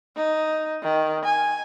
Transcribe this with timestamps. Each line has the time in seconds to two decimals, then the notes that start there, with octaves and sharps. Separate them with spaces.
0.17 D#4
0.83 D#3
1.25 G#5